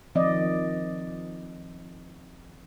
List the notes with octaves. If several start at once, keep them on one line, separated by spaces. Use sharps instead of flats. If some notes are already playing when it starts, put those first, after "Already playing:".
D#3 F3 C4 D5 D#5